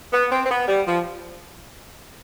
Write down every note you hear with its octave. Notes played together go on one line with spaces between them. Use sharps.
B3
C4
C4
B3
G3
F3